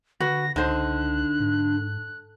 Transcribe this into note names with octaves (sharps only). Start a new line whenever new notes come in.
D3 F#4 B4 A#6
C#2 D3 D#4 C5 F#6
G#2